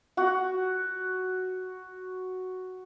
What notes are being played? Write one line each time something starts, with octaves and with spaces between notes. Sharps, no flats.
F#4 F#5